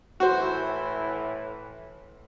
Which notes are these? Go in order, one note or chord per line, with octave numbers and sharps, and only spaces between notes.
A2 E3 F#4 C5